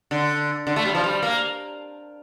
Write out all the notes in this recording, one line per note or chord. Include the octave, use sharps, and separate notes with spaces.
D3
D3
A3
G3
F3
G3
A#3